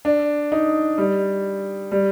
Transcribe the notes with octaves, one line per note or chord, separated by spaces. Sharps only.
D4
D#4
G3
G3